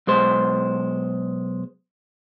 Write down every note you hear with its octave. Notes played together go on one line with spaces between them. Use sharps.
B1 G#3 C5